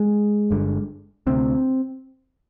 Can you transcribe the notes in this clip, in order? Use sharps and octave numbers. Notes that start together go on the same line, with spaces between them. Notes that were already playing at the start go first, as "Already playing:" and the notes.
Already playing: G#3
G1 G2 D3
D2 C3 C4